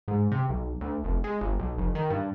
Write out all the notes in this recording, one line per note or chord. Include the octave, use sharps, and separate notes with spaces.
G#2
C3
B1
D2
F1
G#3
G1
B1
F1
D#3
G2